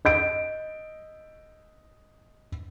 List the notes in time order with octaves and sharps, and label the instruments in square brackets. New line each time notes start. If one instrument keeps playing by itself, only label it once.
[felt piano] D#5 G6 D7